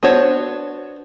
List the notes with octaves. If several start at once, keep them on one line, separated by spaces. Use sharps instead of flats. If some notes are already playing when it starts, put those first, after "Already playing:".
B3 D4 F#4 C5 C#5